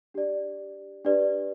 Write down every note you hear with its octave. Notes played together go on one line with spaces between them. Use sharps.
D4 G4 D5
D4 G4 B4 D5